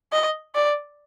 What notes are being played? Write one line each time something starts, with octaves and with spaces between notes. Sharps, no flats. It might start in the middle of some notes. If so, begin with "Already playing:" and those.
D#5
D5